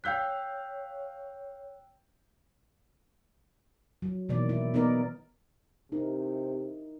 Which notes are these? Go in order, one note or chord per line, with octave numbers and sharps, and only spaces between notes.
C#5 F5 G5 E6 F#6 G6 B6
F#3
B2 D#3 E3 A#3 D5
E4
B3 D#4 A#4 D5
C3 D#4 E4 A#4